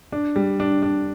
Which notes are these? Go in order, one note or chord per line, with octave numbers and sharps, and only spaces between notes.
D4
G3
D4
D4